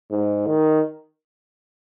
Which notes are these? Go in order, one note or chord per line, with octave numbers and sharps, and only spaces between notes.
G#2
D#3